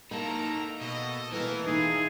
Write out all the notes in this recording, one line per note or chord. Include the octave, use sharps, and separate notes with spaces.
A#3 D#4 E4 A4 A#5
B2 A4 D#5
B2 E3 A3 A#3 A4 A#4
D#4 F4 G#4